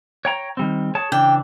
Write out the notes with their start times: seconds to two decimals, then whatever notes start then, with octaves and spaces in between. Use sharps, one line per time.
0.25 C#5 G5 A#5
0.57 D#3 G3 C4
0.95 G#4 C#5 A5
1.12 C#3 E3 D4 G5